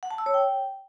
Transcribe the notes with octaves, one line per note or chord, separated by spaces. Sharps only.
F#5
A5
E6
C#5
G5